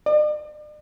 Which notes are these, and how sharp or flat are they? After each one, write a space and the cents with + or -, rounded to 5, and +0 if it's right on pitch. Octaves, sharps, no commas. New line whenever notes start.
D5 +45